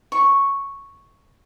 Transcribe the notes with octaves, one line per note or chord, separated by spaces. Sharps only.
C#6